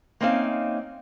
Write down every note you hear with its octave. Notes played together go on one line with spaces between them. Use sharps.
A#3 C4 C#4 D#4 E5 F5